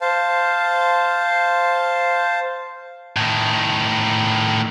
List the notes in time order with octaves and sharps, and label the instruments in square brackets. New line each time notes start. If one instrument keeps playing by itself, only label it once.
[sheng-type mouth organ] C5 F5 A5
[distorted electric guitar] A2 D#3